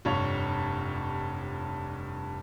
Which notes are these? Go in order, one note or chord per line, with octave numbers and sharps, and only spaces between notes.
F1 G2 C#5